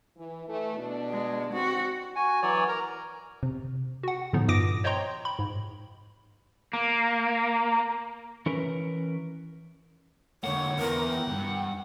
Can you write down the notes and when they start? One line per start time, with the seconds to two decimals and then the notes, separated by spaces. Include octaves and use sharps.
0.16 E3
0.46 E3 A3
0.75 B2 D4
1.10 G#3
1.53 C4 F#4
2.16 F#4 G#5
2.42 E3 F#3 C#5 D5
2.68 A#4 A#5
3.43 C3
4.03 F#4 F#5
4.33 A2 D3 F3 B3 D#4
4.48 G2 A#2 D6 D#6 A#6 D7
4.84 C5 C#5 D#5 G5 A#5 C6
5.25 B5
5.39 G#2
6.73 A#3
8.46 E3 C#4 A#4 B4
10.44 D3 A#3 C#5 F#5
10.79 E3 B3 A#4
11.10 G5
11.28 E2 G2